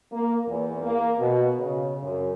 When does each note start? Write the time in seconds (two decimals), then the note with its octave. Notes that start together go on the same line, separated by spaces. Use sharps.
0.12 A#3
0.47 E2
0.82 A#3
1.18 B2
1.59 C#3
2.03 F#2